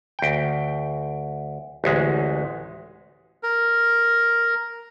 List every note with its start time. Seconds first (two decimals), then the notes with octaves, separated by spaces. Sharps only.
0.19 D2 G5
1.84 A1 D2 G#3
3.43 A#4